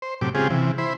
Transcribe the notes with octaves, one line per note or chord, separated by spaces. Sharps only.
C5
F#2 A2 C3 G4 D6
C#3 G#3 C4 F4 G4 G#4
C3 E3
E4 C5 B5